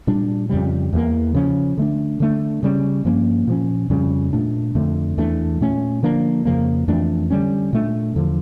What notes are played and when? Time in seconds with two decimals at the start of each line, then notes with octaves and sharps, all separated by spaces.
0.07 A#2 G3 D4
0.49 F2 C#3 G3
0.93 E2 E3 G3 A#3
1.34 C#3 F3 C#4
1.77 D3 A3 D4
2.20 D3 A3 D4
2.63 C#3 G3 C#4
3.05 G2 F3 A#3 C#4
3.47 A#2 F3 C#4
3.90 F2 C#3 G3 C#4
4.33 A#2 A3 D4
4.75 F2 D3 A3
5.18 E2 E3 A3 D4
5.61 A#2 A3 C#4
6.03 D3 F3 A#3 D4
6.45 F2 C#3 F3 A#3
6.88 F2 E3 A3 D4
7.30 D3 G3 C#4
7.73 A#2 A3 D4
8.15 E2 D3 F3